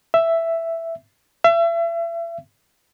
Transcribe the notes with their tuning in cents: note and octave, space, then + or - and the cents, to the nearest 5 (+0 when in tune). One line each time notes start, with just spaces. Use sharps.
E5 +5
E5 +35